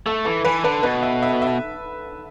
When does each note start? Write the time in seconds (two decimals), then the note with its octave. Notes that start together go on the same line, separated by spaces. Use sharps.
0.06 A3 A4
0.25 E3 A4
0.45 E3 B4
0.64 D3 B4
0.83 B2 B4
1.03 E5
1.23 E5
1.42 E5